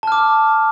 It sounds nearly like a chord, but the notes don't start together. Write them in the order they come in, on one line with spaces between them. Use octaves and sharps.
A5 F6 D6